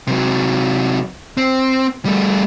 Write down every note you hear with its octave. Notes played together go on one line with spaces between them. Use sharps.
C3 F#3
C4
G3 A3